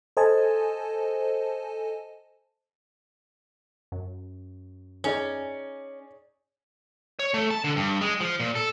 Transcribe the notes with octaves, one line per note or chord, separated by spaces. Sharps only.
A4 C5 D#5 G#5 A5
F#2
C#4 D#4 G#4 D5
C#5
A3
A5
D3
G2
G#3
F3
A#2
A4